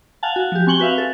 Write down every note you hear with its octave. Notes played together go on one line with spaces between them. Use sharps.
F5 F#5 G#5 A5
F#4
F3 G4
C4 G#5 C#6 F#7 G7
F#4 B4 E5 F5
A4